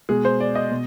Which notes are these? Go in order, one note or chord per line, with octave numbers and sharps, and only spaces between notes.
B2 G#3 G#4
C5
D5
D#5
B2